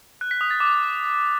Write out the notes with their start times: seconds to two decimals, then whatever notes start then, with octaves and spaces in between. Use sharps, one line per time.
0.21 F#6
0.31 B6
0.41 D#6
0.51 A6
0.60 D6